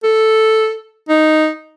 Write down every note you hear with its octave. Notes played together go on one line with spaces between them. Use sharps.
A4
D#4